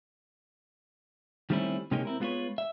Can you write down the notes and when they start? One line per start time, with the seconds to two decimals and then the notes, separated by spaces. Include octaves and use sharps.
1.50 D#3 G3 A3 C4 C#4 E4
1.91 C3 G#3 A#3 C#4 D#4 G4
2.05 C4 E4 A#4
2.20 G#3 B3 F4 G4 B4 C#5
2.58 E5